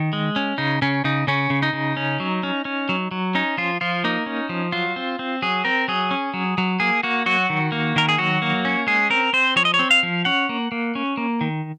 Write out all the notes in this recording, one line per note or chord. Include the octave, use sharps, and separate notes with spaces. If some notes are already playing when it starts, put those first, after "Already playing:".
Already playing: D#3
G#3
C#4
C#3 D#4
C#3 C#4
C#3 D#4
C#3 C#4
C#3
D#4
C#3
C#4
F#3
C#4
C#4
F#3
F#3
C#4 D#4
F3 F4
F3 F4
A#3 D#4
C#4
F3
F#3 F4
C4
C4
F#3 G#4
C4 A#4
F#3 G#4
C#4
F#3
F#3
A#3 G#4
A#3 F#4
F#3 F#4
D#3
A#3
D#3 A#4
G#4
F#3 F#4
A#3
C#4
G#3 G#4
C4 A#4
C4 C5
F3 C#5
D#5
C#5
C4
F5
F3
C#4 F#5
A#3
A#3
C#4
A#3
D#3